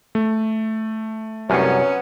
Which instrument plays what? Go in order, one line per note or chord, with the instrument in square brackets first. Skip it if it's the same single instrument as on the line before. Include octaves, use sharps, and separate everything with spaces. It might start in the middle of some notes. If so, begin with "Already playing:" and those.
[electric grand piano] A3
[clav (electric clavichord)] C2 F#2 [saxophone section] F#3 B3 C#4